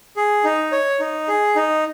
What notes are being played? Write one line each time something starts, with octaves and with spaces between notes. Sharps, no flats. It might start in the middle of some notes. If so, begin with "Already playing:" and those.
G#4
D#4
C#5
D#4
G#4
D#4